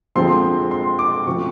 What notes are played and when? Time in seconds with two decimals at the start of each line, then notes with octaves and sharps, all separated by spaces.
0.15 D3 F3 G#3 C4 C6
0.71 C6
0.99 D6
1.26 C#3 F3 A3 C4 C#6